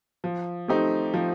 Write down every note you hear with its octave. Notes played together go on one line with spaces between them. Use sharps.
F3
A3 C4 D#4 G4
F3